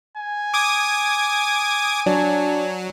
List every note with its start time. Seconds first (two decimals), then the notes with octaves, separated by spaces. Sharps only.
0.17 G#5
0.54 D6 D#6 G#6
2.06 F#3 D4